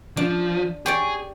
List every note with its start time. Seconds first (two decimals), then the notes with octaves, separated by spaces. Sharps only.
0.17 F3 D4
0.86 G4 G#4 C#5 D5